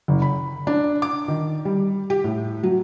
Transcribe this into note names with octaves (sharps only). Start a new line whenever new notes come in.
F#1
B5
D4
D6
D#3
G3
G4
A2
F#3